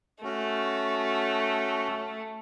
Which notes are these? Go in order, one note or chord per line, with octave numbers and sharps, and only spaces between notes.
A3 C#4 F#4